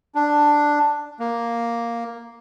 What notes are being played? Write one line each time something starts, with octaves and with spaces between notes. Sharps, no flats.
D4
A#3